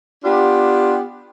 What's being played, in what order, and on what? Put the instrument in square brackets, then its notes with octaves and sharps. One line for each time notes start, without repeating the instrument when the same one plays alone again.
[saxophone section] B3 D4 F4 G4